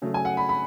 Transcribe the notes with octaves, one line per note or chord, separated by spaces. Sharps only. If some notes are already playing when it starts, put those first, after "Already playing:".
C#3 F#3 A3
G#5
F#5
B5
B5